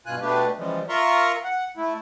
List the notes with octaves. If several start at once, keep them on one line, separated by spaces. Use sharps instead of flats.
G2 B2 F4 G#5 F#6
B2 A3 D4 G4 B4
C#3 E3 F3 G3 G#3
F4 A#4 E5 A#5 C6 C#6
F#5
A3 E4